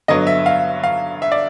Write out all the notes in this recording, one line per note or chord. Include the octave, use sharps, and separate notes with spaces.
G2 D3 F#3 B3 D#5
E5
F5
F5
E5
D5